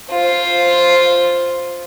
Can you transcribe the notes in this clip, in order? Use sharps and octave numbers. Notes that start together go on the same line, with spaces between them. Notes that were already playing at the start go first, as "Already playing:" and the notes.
F4 C5